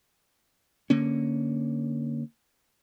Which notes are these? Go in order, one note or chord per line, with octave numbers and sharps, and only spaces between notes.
D3 A#3 C#4